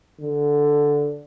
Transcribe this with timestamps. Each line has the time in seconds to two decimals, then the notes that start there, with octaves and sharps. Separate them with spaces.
0.20 D3